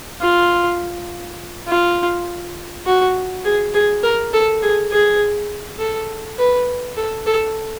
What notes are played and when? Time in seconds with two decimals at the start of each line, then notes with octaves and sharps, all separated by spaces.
0.21 F4
1.68 F4
2.86 F#4
3.44 G#4
3.74 G#4
4.03 A#4
4.33 A4
4.62 G#4
4.91 G#4
5.79 A4
6.38 B4
6.97 A4
7.26 A4